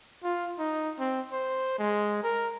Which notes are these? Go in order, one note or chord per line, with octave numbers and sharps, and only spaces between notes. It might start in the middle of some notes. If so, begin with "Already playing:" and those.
F4
D#4
C4
C5
G#3
A#4